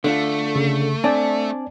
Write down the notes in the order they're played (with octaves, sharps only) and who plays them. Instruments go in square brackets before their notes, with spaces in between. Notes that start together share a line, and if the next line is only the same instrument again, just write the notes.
[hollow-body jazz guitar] D3 D4 F4 [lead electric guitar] A3
[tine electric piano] C#3
[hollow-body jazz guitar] C4 D4 [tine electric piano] D5 G#5 A5